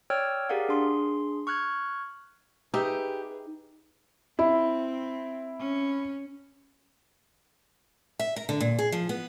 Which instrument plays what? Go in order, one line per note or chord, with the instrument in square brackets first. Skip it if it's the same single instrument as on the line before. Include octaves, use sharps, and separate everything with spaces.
[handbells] C#5 D5 G5 E6 F6 G#6
G4 G#4 A#4 D5 F5 F#5
D4 G#4 C6
C#6 F6 F#6 G#6
[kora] D#4 E5 [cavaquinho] G4 D#6 [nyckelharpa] G#4 B4
[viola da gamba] C4 [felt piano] E4
[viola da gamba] C#4
[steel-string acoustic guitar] E5
A#4
D3
A#2
G#4
F3
B3